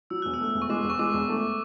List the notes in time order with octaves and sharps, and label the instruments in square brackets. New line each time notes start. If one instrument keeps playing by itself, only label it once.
[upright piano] F#3 [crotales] E6
[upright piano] E1 [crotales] F#6
[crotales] E6
[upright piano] A3
E1
[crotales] C#6
[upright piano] G#3 [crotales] D6
[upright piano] E1
[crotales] C#6
[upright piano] G#3 [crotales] D6
[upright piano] E1
A3